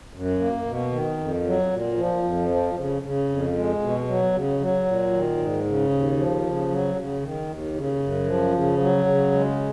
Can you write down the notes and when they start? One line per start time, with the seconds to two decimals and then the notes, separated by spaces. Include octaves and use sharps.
0.14 F#2
0.39 A#3
0.65 B2
0.92 D#3
1.18 F2
1.45 F#3
1.71 A#2
1.97 F3
2.23 F2
2.49 F3
2.75 C#3
3.02 C#3
3.28 F2
3.55 G#3
3.80 B2
4.07 F#3
4.33 C#3
4.60 F#3
4.85 A#2
5.12 D#3
5.37 G#2
5.64 C#3
5.90 D#2
6.17 F3
6.43 C#3
6.69 F#3
6.95 C#3
7.21 D#3
7.48 D#2
7.74 C#3
8.00 F#2
8.26 F3
8.53 C#3
8.79 F#3
9.05 C#3
9.31 G#3